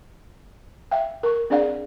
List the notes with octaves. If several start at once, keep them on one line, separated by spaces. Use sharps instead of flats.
E5 F5 G5
A#4 C#6
C4 D4 G#4 D5 F5 F#5